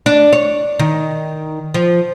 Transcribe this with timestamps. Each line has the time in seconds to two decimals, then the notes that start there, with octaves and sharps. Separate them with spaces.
0.06 D4
0.33 C#5
0.79 D#3
1.74 F3